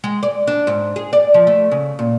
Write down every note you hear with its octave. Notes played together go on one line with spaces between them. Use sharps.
G#3
D5
D4
G#2
G#4
D5
F3
A3
C#3
A#2